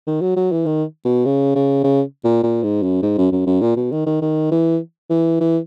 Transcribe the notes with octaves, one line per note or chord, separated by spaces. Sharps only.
D#3
F#3
F#3
E3
D#3
B2
C#3
C#3
C#3
A#2
A#2
G#2
F#2
G#2
F#2
F#2
F#2
A#2
B2
D#3
D#3
D#3
E3
E3
E3